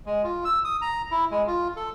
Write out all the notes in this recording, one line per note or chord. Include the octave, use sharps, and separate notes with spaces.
G#3
F4
E6
D#6
A#5
E4
G#3
F4
A4